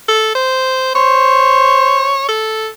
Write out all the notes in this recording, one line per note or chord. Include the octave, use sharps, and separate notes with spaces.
A4
C5
C5 C#5
A4